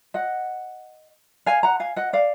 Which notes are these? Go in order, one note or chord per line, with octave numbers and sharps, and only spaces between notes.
D#5 F#5
F5 G#5
F#5 A#5
F5 G#5
D#5 F#5
D5 F5